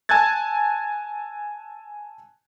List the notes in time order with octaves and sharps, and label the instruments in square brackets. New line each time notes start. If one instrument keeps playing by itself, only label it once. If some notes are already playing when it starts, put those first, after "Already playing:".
[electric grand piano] G#5 A5 E6 F#6 G#6 A6